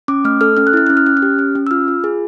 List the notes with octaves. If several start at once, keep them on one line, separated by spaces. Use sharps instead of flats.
C#4 D6
A3 F6
A4 F6
C#4 F6
F#6
E4 F6
C#4 F#6
F6
C#4 F#6
F6
G4
C#4
C#4
E6
F4 F6
F4
G#4